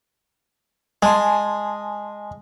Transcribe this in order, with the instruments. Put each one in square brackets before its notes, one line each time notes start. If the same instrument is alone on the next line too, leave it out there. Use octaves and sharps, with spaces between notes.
[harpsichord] G#3 [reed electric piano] G#5 A5 C6